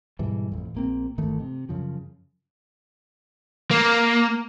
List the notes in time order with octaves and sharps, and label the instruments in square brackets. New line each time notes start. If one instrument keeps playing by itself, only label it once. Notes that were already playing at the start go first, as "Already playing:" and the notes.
[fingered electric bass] G#2 B2 E3 G3
A1 F2
A#1 A#3 C4
G1 D#3 E3 A3
C3
F#2 C#3 F3
[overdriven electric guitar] A#3